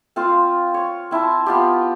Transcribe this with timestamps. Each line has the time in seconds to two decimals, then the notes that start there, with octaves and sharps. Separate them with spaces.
0.16 C4 F4 C5 F5
0.74 C#5
1.11 C4 E4 E5 A5
1.46 B3 F4 G4